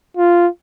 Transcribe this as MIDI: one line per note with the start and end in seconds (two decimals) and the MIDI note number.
0.17 0.48 65